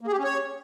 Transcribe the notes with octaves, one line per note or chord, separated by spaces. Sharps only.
A#3
G#4
G4
C#4
C#5